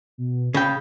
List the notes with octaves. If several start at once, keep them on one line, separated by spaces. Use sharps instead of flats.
B2
C#3 G5 B5